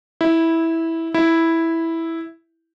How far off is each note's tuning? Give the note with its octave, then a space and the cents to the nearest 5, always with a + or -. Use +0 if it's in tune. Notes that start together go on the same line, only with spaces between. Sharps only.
E4 -10
E4 -5